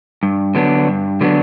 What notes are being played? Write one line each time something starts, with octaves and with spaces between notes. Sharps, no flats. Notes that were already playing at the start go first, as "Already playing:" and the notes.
G2
D3 F#3 B3 D4
G2
D3 F#3 B3 D4